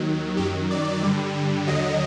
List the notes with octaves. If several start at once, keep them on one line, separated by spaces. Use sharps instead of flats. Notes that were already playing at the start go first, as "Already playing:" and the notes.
Already playing: D#2 D#3 F#3
F#2 D#3 F#3 G4
D5
G2 D3 G3
D#2 D3 F#3 D#5